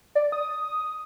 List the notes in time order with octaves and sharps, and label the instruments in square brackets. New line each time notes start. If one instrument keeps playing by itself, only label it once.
[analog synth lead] D5
D#6